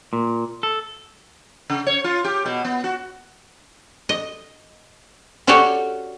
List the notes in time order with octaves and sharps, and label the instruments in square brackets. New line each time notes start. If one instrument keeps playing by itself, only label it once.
[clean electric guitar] A#2
A4
[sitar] C#3
C#5
F4
G4
B2
B3
F#4
[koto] D#5
C#4 F#4 G4 A4 C#5 D5